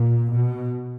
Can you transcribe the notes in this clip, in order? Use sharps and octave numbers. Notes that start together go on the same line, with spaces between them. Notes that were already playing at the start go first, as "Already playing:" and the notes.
Already playing: A#2
B2